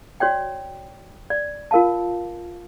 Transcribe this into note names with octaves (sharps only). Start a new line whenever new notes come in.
F#4 C#5 D5 G5
D5
F4 A#4 F5 A5